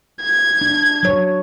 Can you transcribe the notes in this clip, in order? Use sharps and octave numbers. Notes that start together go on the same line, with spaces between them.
G#6
D4
F#3 C#5